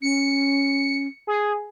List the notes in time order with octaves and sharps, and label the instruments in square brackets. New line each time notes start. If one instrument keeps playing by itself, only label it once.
[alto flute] C#4 [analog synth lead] C#7
[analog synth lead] G#4